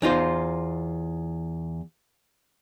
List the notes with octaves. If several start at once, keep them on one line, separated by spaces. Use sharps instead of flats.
E2 D#4 F4 C5